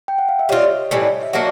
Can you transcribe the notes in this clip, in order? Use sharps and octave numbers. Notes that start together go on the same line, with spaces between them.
G5
F#5
F5
E5
G3 C4 F4 C#5 D#5
A2 E3 G3 C4
E5
F#3 A#3 D4 F#4 C#5 D#5